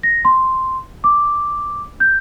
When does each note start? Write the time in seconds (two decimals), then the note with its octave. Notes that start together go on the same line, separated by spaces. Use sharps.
0.03 A#6
0.25 C6
1.04 D6
2.00 G6